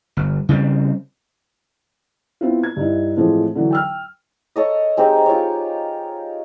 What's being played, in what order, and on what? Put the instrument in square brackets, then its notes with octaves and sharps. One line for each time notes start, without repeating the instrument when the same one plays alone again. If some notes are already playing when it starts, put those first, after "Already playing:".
[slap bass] G1
C#3 G3 A#3 C4
[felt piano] B3 C4 E4 F4
G#6
G2 D#4 E4
A2 E3 F3 G#3 C4
D3 E3 F#3
G5 E6 F6
[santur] A4 C#5 D#5
G#3 C4 D#4 G4
F4 A#4 C#5